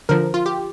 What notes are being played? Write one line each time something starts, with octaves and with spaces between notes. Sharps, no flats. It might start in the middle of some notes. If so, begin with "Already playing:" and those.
D3 F3 A#4
F4
G4